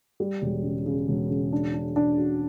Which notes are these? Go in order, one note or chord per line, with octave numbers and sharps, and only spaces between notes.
G3
E1
C#3
C#3
E1
C#3
D4
D4
D4
F#4